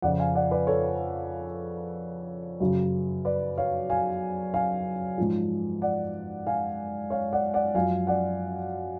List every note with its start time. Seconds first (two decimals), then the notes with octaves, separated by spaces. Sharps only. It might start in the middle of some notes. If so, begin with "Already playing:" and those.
0.02 F2 C#3 F3 D5 F#5
0.19 F5 G#5
0.35 D5 F#5
0.51 B4 D5
0.67 A4 C#5
2.60 F#2 C#3 F#3
3.25 B4 D5
3.58 C#5 F5
3.90 F5 G#5
4.54 F5 G#5
5.18 G#2 F3
5.82 D5 F#5
6.47 F5 G#5
7.10 C#5 F5
7.33 D5 F#5
7.54 D5 F#5
7.75 F#2 F3 F5 G#5
8.07 D5 F#5